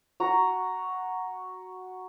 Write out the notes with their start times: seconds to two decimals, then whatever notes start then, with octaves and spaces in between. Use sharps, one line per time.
0.20 F#4 A#5